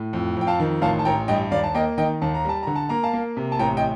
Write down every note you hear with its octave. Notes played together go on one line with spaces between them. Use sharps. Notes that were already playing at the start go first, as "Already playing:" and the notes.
Already playing: A2
F2
F2 G5
F5 A5
D#3
A1 F5 A5
A5
A1 G5 A#5
G2 D#5 G5
D#2 D5 F5
A5
A#3 D#5 G5
D#3 D#5 G5
D#2 A5
A#5
G3 A5
D3 A#5
A5
A#3 A#5
F5 A5
A#3
C3
A5
A1 G5 A#5
D#5 G5